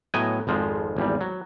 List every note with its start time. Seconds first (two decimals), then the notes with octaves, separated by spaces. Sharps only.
0.14 A2 F#3 B3 D#5 G5 G#5
0.47 G#1 F2 F3 G#3
0.97 G#1 E2 G3
1.21 F#3